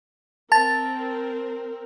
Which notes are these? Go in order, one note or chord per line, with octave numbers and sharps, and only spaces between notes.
C4 A#4 A5 A6